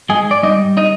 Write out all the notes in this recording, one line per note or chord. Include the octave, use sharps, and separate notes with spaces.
G#2 G#3 G#4
D5
G3 D#4 D#5
D#4 D#5